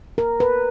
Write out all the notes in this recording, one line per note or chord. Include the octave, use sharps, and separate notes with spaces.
A#4
B4